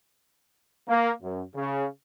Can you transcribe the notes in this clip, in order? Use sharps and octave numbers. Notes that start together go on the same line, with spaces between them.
A#3
F#2
C#3